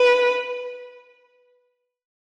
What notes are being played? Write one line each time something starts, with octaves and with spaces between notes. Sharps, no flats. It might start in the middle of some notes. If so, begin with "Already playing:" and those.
Already playing: B4